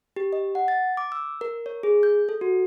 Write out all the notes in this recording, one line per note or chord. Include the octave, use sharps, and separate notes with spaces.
G4
D#5
F#5
A6
D6
E6
A#4
C#5
G#4
G6
A4
F#4